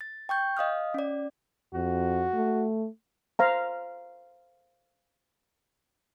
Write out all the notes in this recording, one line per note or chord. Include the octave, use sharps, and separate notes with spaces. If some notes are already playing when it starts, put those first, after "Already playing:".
A6
G5 C#6 G6
D#5 F5 D#6 F6
C#4 D5
F2 F#4
A3
C5 F5 A#5